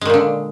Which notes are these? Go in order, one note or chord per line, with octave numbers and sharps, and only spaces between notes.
A#2 D3 D#3 G#3